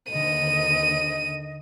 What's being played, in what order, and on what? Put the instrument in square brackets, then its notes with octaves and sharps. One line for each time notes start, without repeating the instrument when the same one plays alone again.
[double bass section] D#2 D3 [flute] D#5 [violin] D#7